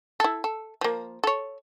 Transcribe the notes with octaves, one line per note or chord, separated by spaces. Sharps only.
E4 A4
A4
F3 A#3
A4 C#5